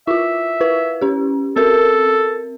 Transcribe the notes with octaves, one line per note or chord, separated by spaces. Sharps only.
E4 F4 E5
E4 B4
C#4 G4
C4 A4 A#4